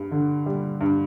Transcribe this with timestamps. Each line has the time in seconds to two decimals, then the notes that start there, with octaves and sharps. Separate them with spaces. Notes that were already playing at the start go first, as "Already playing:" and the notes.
Already playing: G2
0.11 D3
0.46 G3
0.81 G2